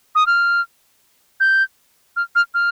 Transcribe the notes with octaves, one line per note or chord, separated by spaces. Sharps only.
D#6
F6
G6
F6
F6
F6